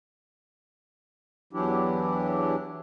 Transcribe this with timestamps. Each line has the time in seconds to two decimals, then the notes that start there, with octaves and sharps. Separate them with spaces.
1.53 E2 E3 F#3 D4 E4 G4